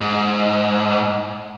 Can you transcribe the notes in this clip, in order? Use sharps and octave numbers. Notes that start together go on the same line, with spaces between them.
G#2